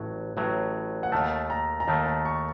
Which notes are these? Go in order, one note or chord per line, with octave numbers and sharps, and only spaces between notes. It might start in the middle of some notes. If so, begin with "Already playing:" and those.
Already playing: A1 A2 F#3
A1 A2 F#3
F#5
D#2 D#3 A3 A5
A#5
A#5
D#2 D#3 A3 A5
A#5
C#6